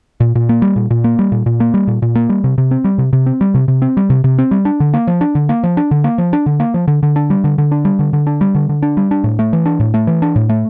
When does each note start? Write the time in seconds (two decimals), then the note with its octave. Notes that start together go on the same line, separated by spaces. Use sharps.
0.20 A#2
0.35 A#2
0.49 A#3
0.62 G3
0.76 A#2
0.90 A#2
1.04 A#3
1.19 G3
1.32 A#2
1.46 A#2
1.60 A#3
1.74 G3
1.87 A#2
2.02 A#2
2.15 A#3
2.29 G3
2.44 C3
2.58 C3
2.71 C4
2.84 G3
2.98 C3
3.13 C3
3.26 C4
3.41 G3
3.55 C3
3.68 C3
3.82 C4
3.97 G3
4.10 C3
4.24 C3
4.39 C4
4.51 G3
4.65 D4
4.80 D3
4.94 A#3
5.07 F3
5.21 D4
5.35 D3
5.49 A#3
5.63 F3
5.77 D4
5.91 D3
6.04 A#3
6.18 F3
6.33 D4
6.46 D3
6.60 A#3
6.74 F3
6.88 D3
7.03 D3
7.16 D4
7.30 G3
7.44 D3
7.58 D3
7.71 D4
7.85 G3
7.99 D3
8.13 D3
8.27 D4
8.41 G3
8.55 D3
8.69 D3
8.82 D4
8.97 G3
9.11 D4
9.24 A2
9.39 A3
9.53 E3
9.66 D4
9.80 A2
9.94 A3
10.07 E3
10.22 D4
10.36 A2
10.49 A3